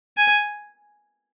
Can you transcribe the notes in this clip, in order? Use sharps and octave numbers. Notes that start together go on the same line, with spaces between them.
G#5